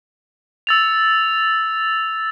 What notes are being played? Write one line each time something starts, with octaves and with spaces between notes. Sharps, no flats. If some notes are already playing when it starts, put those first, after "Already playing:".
E6 A6 F7